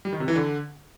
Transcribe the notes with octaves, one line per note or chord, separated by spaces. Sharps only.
G3
D#3
C3
E3
D3